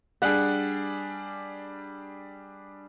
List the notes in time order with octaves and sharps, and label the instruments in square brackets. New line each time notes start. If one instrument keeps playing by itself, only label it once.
[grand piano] G3 D4 G#4 [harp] F#5